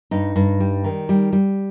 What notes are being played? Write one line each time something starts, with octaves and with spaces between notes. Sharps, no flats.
G2 D#4
G2
G3
D#3
G3
G3